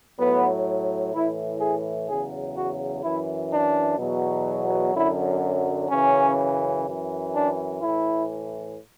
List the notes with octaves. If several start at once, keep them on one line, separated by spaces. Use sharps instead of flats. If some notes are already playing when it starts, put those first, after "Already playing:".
A2 F#3 B3
A2 E3 E4
G#4
E2 C#3 F#3 G#4
F#4
F#2 E3 E4
D4
E2 B2 F#3
F#2 D3 F#3 E4
F#2 C#3 E3 C#4
F#2 E3
D4
A2 E3 E4